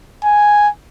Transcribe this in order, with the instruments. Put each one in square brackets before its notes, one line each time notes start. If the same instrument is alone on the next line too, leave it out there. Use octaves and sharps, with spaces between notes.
[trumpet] G#5